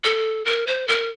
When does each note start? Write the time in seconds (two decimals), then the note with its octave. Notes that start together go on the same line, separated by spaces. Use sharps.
0.04 A4
0.45 A#4
0.67 C5
0.88 A#4